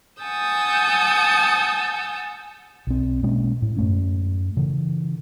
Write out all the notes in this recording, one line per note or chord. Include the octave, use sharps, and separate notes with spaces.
F#5 G#5 A5 D#6 E6 G6
B1 C4
B2 G#3 A#3 C#4
A2
F#2 A3 C#4
C#3 E3